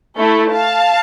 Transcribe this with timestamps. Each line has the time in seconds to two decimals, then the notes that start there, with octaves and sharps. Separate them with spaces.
0.17 A3 E4 A4
0.53 F5 A5